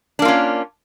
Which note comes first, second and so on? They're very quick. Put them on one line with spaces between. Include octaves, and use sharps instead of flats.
D4 A#3 F4 C#4